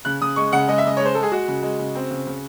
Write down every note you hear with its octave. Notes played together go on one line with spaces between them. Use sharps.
C#3 F#6
C#3 D#6
G#3 C#6
C#3 F#5
G#3 D#5
E5
C#3 D#5
G#3 C#5
C5
G#3 A4
G#4
G#3 F#4
C#3
G#3
C#3
C4
C#3
C#3